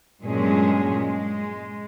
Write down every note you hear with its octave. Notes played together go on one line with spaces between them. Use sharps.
G2 A#2 F#3 G#3 C#4 G#4
G#3